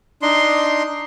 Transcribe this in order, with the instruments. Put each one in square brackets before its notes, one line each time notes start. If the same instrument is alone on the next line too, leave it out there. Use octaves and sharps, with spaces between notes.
[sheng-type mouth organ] D4 D#4 C6